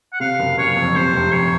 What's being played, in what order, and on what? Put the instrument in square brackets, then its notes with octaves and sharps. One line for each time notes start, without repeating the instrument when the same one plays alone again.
[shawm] F#5
[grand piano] C3 [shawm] F5
[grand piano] F#1
[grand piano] F#1 [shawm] C#5
[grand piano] F2
[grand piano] C3 [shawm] C5
[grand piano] F1
[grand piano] F1 [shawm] C#5